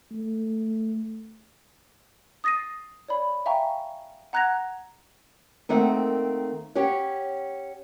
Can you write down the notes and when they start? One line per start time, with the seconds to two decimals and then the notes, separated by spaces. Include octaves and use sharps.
0.12 A3
2.44 D#6 A6 A#6 C7 D#7
3.08 C#5 D5 B5
3.46 E5 F5 G5 G#5 A#5 C#6
4.33 F#5 A#5 F#6 G#6 A#6 F7
5.69 D#3 A3 A#3 C4 F#5
6.75 C#4 G4 C#5 F#5